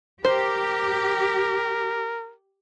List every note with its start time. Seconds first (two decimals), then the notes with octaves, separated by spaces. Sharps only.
0.25 G4 A#4 C5